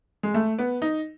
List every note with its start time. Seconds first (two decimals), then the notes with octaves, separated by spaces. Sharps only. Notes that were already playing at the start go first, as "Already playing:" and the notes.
0.23 G#3
0.34 A3
0.59 B3
0.82 D#4